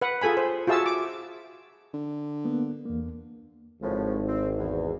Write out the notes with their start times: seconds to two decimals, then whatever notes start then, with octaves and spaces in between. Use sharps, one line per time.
0.02 B4 F#5
0.22 F4 G#4 A4 G#5 B5
0.37 C5
0.67 F4 F#4 G#4 E5 A5 E6
0.86 D6
1.94 D3
2.45 A#3 B3
2.86 E2 A#3
3.82 G#1 A2 C#3 F3
4.28 C4
4.58 E2